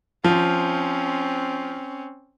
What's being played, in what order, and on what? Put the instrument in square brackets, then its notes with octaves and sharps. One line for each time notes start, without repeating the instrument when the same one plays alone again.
[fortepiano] F3 [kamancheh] C4 C#4